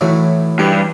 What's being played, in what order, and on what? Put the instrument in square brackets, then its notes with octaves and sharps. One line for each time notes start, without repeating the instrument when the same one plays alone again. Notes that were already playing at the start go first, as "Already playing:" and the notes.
[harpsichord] A2 F#3 A3 [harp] E3 E4 C#5
[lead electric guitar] G2 [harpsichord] G4